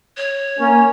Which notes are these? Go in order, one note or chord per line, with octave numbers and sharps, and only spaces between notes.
C#5
A#3 C#4